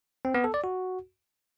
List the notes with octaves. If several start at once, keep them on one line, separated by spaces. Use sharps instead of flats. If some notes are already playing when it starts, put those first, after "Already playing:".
C4
B3
A4
D5
F#4